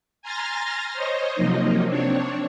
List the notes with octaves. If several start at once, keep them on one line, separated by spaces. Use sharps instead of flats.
G#5 A#5 C6 F6 A6 A#6
C5 C#5 D#5
C3 F3 F#3 A#3 D#4
C4 D4 C#5